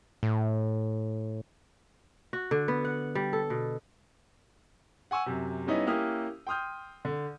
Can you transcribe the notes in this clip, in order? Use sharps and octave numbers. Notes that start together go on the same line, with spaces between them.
A2
F#4
D3
B3
F#5
G3
A4
B2
F#5 G#5 C#6 E6
F#2 C3
G3 B3 C#4 D#4 E4 D#5
A#3 C#4 E4 G4 D#6 F6
G5 C6 D#6 F6 G6
D3